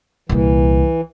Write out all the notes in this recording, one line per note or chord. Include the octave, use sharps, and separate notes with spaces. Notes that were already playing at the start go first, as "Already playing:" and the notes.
C2 A#2 E3